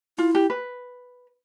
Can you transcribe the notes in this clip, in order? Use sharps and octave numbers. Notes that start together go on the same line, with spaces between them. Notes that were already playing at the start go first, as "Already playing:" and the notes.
E4 F4
G4
B4